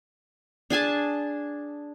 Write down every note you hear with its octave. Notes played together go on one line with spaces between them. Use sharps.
D4 G#4 G#5 A5